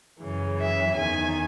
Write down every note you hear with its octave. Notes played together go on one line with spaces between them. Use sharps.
F#2 C#3 E3
E5
E2 D#3 G#5